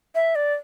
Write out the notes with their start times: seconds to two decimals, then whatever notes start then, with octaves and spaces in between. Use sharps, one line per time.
0.15 E5
0.35 D5